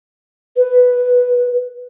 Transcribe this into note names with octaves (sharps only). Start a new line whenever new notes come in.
B4